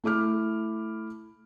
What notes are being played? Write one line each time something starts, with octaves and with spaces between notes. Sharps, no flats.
A3 E4 D6 F6